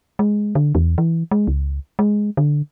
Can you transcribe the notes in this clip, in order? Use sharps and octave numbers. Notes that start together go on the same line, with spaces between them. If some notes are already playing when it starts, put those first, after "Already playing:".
G#3
D3
E2
E3
G#3
C#2
G#3
D3